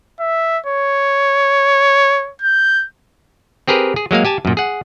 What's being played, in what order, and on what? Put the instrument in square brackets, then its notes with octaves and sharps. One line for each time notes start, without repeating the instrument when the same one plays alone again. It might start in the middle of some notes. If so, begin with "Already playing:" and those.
[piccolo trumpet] E5
C#5
G6
[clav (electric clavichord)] C4 G4 G#4 A#4 B4
G#4
F#3 G#3 A#3 F5
G4 G#5 A5
F#2 A#2
G#4 F#5